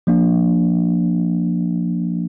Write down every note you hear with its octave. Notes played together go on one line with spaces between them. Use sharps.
F3 A#3 D4